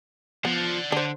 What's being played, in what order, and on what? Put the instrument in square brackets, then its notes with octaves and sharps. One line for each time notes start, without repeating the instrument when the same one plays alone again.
[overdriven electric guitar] F3 [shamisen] B3 [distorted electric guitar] D5 F#5
[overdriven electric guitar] D3 [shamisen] D4 C5